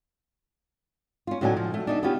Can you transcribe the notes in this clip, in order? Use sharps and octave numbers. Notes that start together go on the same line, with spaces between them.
C#4 F4
A2 D3 F#3 C#4 D#4 G#5
F3
A3
D4 D#4 E5
B3 C#4 F4 G4